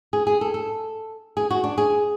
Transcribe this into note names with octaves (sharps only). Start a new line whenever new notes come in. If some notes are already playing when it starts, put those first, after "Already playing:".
G#4
G#4
A4
A4
G#4
F#4
D4
G#4